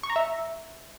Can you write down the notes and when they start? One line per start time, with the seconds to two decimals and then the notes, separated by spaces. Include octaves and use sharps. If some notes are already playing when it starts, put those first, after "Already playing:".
0.03 C#6
0.10 A#5
0.16 E5